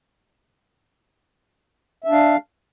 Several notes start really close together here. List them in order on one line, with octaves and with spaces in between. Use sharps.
E5 D4 F5